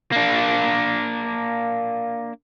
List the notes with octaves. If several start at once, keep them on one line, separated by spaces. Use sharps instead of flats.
A#3 D4